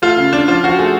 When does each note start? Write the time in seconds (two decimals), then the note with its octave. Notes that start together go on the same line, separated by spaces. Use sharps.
0.02 A3 F4
0.17 C#3
0.33 C#3 D4
0.48 F3 F4
0.64 F3 F#4
0.79 A3 G#4